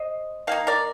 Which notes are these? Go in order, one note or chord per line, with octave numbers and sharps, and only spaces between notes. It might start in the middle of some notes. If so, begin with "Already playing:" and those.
Already playing: C5 D#5
D#3 A#3 D#4 F5
A#4 D5